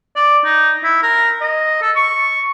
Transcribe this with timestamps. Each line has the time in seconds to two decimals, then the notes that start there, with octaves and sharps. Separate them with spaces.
0.16 D5
0.44 D#4
0.84 E4
1.03 A#4
1.41 D#5
1.82 A4
1.96 C#6